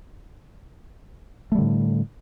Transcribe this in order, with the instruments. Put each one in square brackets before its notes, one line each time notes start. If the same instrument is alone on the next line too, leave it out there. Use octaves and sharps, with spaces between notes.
[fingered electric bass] A3
G3
D3
A2